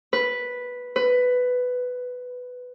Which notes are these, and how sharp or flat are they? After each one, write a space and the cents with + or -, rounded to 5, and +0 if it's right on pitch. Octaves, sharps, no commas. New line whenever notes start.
B4 -5
B4 +10